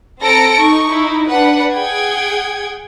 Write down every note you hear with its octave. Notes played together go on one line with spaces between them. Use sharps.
C4 A4 A#5 A#6 C#7 D7
D#4 C#6
D#4 E4
D4 B4 F#5
G#4 F#5 G5 G#6